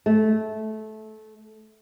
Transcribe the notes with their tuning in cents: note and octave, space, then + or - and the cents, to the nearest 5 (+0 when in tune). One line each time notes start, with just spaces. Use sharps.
A3 -20